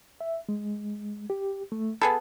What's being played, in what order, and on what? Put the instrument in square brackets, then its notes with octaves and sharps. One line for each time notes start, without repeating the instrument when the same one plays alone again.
[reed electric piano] E5
G#3
G4
A3
[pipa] B3 G#4 A4 [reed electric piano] B5